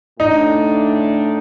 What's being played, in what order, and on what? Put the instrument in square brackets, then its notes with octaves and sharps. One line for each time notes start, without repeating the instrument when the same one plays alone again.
[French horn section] A2 A3 D4 [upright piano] D#4